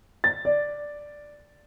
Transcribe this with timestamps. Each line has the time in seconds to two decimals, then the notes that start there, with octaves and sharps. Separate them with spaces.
0.24 A6
0.45 D5